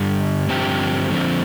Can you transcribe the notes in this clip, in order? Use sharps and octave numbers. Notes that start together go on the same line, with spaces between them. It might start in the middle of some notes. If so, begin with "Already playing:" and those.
Already playing: G2 D3 G3
G2 D3 F3 C4 G4
D3 F3 C4